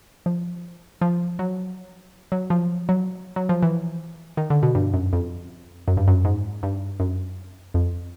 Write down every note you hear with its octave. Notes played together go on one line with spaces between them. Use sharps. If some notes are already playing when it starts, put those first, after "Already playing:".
F3
F3
F#3
F#3
F3
F#3
F#3
F3
E3
D#3
D3
B2
G2
F#2
F2
F#2
G2
F#2
G#2
G2
F#2
F2